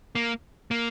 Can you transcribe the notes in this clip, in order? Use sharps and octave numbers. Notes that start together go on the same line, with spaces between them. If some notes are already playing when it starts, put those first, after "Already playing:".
A#3
A#3